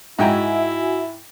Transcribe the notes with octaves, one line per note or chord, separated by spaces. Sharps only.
G#2 E4 F#4 E5 G5 G#5 A#5